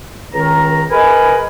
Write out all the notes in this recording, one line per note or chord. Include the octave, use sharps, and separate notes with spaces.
C#2 D#3 A#5
G#4 A#4 B4 D#5 G#5 B5